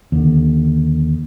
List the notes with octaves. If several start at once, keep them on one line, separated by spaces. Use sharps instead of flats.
D#2 D3